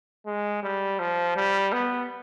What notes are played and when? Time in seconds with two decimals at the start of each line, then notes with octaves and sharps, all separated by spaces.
0.26 G#3
0.63 G3
1.00 F3
1.36 G3
1.73 B3